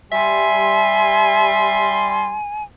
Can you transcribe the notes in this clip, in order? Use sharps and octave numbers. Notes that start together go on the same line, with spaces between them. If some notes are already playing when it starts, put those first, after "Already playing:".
G3 E5 G#5 C6